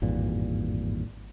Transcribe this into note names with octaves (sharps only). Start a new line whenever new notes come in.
G#1 E2 G2 A#2